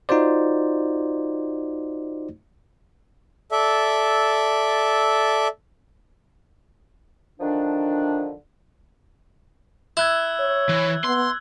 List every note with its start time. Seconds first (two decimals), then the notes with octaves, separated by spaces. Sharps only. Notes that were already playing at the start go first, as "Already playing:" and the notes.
0.09 D#4 F4 F#4 C5 D5
3.52 A4 D5 E5
7.40 D3 D#3 F3 D4
9.97 E4 E6 F#6 G#6
10.40 C#5
10.69 E3
11.04 B3 C6